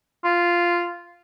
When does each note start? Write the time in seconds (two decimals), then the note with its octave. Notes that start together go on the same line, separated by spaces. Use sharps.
0.24 F4